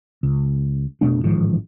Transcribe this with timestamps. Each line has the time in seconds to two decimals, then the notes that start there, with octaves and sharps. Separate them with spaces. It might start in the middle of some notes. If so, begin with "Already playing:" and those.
0.23 C#2
1.01 F1 B2 A3 D4
1.24 A1 G#2 D#3 F3